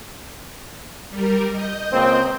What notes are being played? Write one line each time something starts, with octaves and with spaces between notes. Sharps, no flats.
G3 A#4
D#5 G6
C#2 A#3 C4